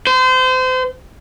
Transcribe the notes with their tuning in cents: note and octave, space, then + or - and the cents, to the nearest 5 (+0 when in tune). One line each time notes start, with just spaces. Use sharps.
C5 -30